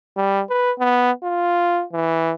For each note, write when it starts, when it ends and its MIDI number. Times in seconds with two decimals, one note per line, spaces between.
0.16 0.42 55
0.49 0.72 71
0.79 1.11 59
1.23 1.84 65
1.93 2.33 52